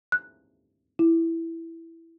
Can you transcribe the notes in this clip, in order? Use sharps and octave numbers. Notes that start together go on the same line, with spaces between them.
F#6
E4